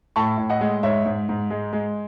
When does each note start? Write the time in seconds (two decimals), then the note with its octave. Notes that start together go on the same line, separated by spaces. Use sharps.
0.16 A2 A5 C#6
0.38 A2
0.50 D#5 F#5
0.61 G#3
0.83 G#2 C#5 E5
1.06 G#2
1.29 G#2
1.50 G#3
1.73 G#3